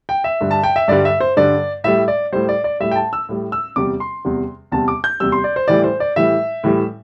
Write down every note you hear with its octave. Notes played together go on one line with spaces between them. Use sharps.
G5
E5
G2 D3 G3
A5
G5
E5
G2 D3 G3 D5
E5
C5
G2 D3 G3 D5
A2 G3 E5
D5
A2 G3 C5
D5
D5
A2 G3 E5
G5
A5
E6
A2 G3
E6
E2 C3 G3 D6
C6
E2 C3 G3
E2 C3 G3 A5
D6
G6
E2 C3 G3 E6
C6
D5
C5
A2 E3 G3 D5
C5
D5
A2 E3 G3 E5
A2 E3 G3